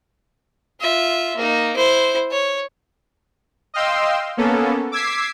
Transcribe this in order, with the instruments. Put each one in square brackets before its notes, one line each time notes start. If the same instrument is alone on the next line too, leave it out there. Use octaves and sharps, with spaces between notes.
[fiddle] F4 E5
A#3 D#4
E4 C5
C#5
[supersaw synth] D#5 F5 G5 C6 E6
A#3 B3 C#4 A4
D6 E6 G#6 B6 C7